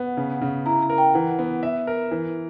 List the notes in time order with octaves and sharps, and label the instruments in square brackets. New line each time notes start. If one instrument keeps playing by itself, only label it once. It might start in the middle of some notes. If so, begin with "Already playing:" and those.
Already playing: [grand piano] B3 [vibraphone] F#5
[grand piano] C#3
C#3
[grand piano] E4 [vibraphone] A#5
[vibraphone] A#5
[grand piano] A#4
[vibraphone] G5
[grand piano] E3 [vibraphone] F#5
[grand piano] B3
E5
A#4
E3